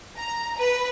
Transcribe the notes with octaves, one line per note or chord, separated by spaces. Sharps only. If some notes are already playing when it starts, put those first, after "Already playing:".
A#5
B4